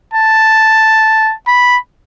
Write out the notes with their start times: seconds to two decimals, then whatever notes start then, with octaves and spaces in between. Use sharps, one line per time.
0.14 A5
1.48 B5